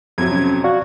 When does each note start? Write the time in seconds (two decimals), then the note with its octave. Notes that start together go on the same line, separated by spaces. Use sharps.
0.18 F2 C3 F#3 G#6
0.32 C#4
0.64 F#4 D5 F5